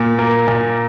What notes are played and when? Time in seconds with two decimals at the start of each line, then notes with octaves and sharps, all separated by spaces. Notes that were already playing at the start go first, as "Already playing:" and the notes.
Already playing: A#2
0.19 A#3
0.48 A#2